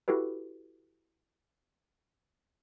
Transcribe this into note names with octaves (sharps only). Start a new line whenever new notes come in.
E4 F#4 G4 A4 B4